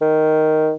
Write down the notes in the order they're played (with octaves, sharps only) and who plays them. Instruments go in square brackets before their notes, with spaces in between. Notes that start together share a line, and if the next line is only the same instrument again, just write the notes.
[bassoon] D#3